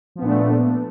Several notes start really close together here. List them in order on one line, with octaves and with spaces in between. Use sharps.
F3 B3 A#2 D4 A3